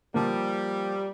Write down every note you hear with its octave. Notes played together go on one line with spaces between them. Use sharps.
F3 G3 A#3